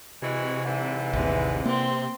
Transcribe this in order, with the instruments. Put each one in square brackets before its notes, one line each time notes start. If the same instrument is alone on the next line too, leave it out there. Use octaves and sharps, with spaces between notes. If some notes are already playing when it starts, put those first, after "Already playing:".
[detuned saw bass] C3 [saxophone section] E3 G#3 F#4
[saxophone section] G#2 D3 E3
[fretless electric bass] A1 D#2 [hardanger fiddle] G#3 B4
[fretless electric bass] A#3 [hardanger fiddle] C4 C6